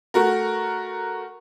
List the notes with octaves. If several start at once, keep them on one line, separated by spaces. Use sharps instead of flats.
A3 F#4 A#4